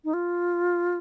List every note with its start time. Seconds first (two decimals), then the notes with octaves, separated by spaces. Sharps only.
0.04 D#4
0.14 F4